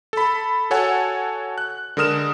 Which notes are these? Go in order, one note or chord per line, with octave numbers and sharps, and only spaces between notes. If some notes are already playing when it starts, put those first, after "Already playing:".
A4 B5
F#4 A4 C#5 F#5 G#5
F#6
D3 G#3 A#4 D#6 F6 E7